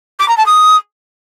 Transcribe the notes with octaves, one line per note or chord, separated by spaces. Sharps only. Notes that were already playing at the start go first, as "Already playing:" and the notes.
D6
A#5
A5
D#6